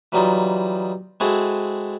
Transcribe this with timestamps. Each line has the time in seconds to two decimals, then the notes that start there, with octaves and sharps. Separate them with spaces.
0.12 E3 F#3 G3 D#4 F4
1.20 G#3 C4 E4 F#4 G#4 A4